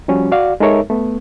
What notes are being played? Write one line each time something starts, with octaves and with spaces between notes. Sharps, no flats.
F3 G3 C#4 F#4
F#4 D5 F5
G#3 D#4 A4 A#4 C#5 E5
A3 B3